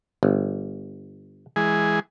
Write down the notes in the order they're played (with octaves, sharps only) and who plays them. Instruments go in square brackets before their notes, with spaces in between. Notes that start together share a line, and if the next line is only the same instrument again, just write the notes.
[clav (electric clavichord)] G1
[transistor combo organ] E3 G#3 G#4